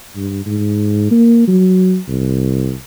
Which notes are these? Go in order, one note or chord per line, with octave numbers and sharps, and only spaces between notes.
G2
G#2
A#3
F#3
C2